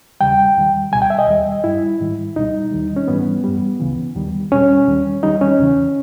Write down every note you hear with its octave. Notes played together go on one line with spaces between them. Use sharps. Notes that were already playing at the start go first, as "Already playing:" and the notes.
D#2 C#3 G3 G5
E2 D#3 G3
C#2 B2 G3 G#5
G5
E5
D#5
D#2 D#3 G3
G2 G3 E4
G#2 D#3 G3
C#2 B2 G3 D#4
D#2 D#3 G3
C#4
G#2 E3 G3 B3
G2 G3
C#2 C#3 E3
D#2 D#3 G3
E2 B2 G3 C#4
D#2 D#3 G3
E2 D#3 G3 D#4
C#4
E2 C#3 E3